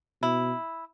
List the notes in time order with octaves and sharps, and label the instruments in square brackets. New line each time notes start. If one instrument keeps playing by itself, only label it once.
[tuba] B2 [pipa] E4